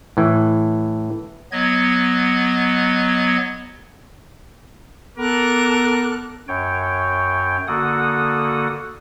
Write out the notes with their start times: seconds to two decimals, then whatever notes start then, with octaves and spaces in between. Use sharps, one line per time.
0.17 A2 E3
1.52 F#3 B3 D#5 G#6
5.18 B3 A4 A#4 D6 F#6
6.48 F#2 C#5 G5
7.68 D3 A#3 F#4 A4 F#5 D#6